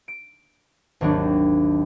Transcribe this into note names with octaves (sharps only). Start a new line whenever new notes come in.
D7
G#1 D#2 F#3 D4 C#5